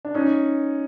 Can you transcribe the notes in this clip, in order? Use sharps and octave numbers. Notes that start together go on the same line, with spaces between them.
D4
C#4 D#4